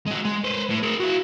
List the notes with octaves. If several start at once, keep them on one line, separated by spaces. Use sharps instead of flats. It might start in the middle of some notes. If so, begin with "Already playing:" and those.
G#3 F#4
G#3
B4 C5
A2
G#4 A#4
E4 F#4